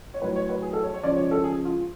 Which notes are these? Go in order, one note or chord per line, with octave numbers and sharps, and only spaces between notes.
C#5
A2 F#3 B4
C#5
B4
G#4
A4
C#5
C#5
C#3 F3 G#3 D5
C#5
A4
G#4
F4